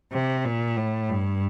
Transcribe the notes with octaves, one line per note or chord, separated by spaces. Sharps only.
C3
A#2
A2
G2